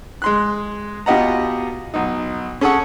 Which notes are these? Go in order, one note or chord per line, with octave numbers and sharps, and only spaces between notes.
G#3 C6 F#6
B2 F4 G4 D#5 F#5 A#5
B1 D#4
C#4 G#4 A4 C#5 F#5 C#6